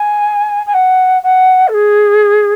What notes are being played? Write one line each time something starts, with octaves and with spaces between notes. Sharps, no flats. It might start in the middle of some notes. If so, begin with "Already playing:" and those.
Already playing: G#5
G#5
F#5
F#5
A4
G#4